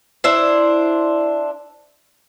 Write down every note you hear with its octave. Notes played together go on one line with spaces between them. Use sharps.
D4 E4 C5